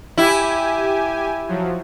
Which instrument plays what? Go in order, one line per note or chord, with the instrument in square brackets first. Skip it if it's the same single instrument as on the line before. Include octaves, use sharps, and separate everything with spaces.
[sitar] E4 [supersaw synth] G4 G#5
[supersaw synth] F3 F#3